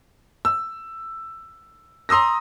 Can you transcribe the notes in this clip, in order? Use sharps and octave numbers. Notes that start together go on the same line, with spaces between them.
E6
A#5 C6 D#6 E6 A#6